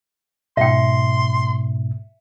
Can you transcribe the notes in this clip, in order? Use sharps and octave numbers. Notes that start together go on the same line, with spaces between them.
G#2 B2 E5 G5 C6